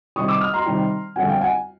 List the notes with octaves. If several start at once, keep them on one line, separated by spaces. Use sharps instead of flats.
C3 D#3 G3 C#6 D#6
D6 E6
D#6 F6
A#5 C6
C3 D#3 G3
F2 D3 G3 C4 F#5 G#5
F5 G5
F#5 G#5